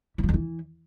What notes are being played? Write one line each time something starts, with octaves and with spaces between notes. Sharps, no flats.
E3
F3
F2
E3